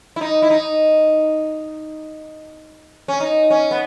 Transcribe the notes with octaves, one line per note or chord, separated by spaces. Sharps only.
E4
D#4
E4
D#4
C#4
D#4
C#4
B3